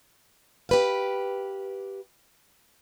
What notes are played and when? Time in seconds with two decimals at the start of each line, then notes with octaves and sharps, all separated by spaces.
0.69 G4 B4 F5